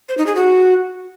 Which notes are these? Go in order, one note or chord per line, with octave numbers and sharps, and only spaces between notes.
C5
D#4
G#4
F#4